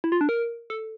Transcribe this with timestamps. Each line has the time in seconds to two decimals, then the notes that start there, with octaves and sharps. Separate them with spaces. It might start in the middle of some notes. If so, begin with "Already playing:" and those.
0.04 E4
0.12 F4
0.21 D4
0.29 A#4
0.70 A4